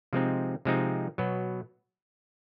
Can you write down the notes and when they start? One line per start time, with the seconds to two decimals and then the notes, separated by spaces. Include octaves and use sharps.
0.13 C3 F3 G#3 C4 D#4
0.65 C3 F3 G#3 C4 D#4
1.18 B2 F#3 B3